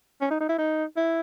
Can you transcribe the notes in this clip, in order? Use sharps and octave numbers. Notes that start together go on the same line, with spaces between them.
C#4
D#4
D#4
E4
D#4
E4